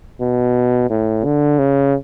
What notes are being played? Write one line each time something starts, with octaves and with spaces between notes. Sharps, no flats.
B2
A2
D3
C#3